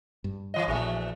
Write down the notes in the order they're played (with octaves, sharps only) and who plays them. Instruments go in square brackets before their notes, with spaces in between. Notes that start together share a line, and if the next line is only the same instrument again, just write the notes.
[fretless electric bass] G2
[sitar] E3 D#5
[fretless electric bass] A#1 [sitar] E2 F3 A3